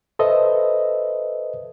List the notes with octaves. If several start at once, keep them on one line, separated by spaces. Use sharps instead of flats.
A4 B4 C5 D#5 E5